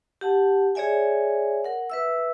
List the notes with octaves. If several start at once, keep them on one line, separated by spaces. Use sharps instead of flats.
G4 F#5 A5
G#4 C#5 D5 E5 G#5
A#4 F#5
B4 E5 E6